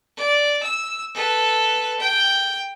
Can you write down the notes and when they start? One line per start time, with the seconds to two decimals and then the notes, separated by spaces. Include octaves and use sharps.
0.16 D5
0.63 E6
1.14 A4 B4
2.00 G5